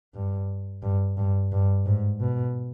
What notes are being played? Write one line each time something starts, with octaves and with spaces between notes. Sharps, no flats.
G2
G2
G2
G2
G#2
B2